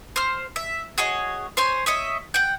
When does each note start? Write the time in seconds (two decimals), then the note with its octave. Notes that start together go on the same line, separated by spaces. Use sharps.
0.16 C5 F6
0.56 E5
0.98 F#4 G#4 C#5 D#5
1.57 C5 C#5 G#5 C6
1.86 C#5 D#5 E5
2.34 F#5 G5